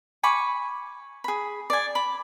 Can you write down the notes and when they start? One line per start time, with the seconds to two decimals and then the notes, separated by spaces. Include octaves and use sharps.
0.23 G#5 B5 C#6 D6
1.24 G#4 B5
1.70 D5 G#5
1.95 B5 D6